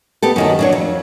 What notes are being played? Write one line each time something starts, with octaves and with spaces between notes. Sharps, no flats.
B3 G4 A4
F#2 D#3 F#4
F#3 D4 C#5
F2